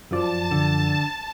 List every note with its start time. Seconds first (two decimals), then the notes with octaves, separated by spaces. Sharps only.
0.11 F#2 F3 D5 A5
0.51 D3